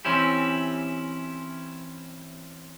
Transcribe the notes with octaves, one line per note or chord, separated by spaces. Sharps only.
E3 C4 C#4 E4 G4